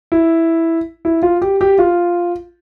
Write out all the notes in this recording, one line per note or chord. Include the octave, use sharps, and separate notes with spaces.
E4
E4
F4
G4
G4
F4